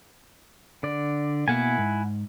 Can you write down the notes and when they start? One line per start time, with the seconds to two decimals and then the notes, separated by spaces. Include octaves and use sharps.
0.83 D3 D5
1.48 B2 A#3 E4 F#5 G#5
1.78 G#2